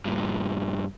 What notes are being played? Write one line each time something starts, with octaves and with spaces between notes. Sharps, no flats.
G2 A#2